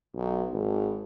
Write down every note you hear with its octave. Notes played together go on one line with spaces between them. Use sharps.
B1
G#1